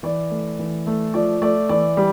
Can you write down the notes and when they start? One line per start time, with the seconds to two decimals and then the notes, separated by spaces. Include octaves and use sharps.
0.03 E3 D5
0.31 A3
0.59 E3
0.87 A3
1.14 F3 D5
1.42 A3 D5
1.69 E3 D5
1.97 G3